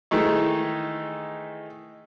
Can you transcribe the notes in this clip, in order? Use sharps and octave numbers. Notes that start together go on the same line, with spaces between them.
D#3 E3 G#3 A3 D#4